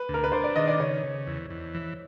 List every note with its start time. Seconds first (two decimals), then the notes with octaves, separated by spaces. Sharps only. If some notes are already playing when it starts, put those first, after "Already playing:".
Already playing: B4
0.09 D2
0.14 A#4
0.24 B4
0.32 D4 C5
0.44 D5
0.56 D#3 D#5
0.68 D5
0.80 C#3 C#5
1.03 C#3
1.27 E2
1.50 E2
1.74 E3